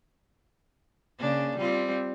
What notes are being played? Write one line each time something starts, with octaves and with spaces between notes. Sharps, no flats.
C#3 A#3 D4
G3 C4 F4